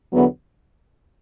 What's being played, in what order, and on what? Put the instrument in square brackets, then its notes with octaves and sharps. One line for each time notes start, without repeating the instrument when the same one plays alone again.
[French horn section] E2 D3 F#3 B3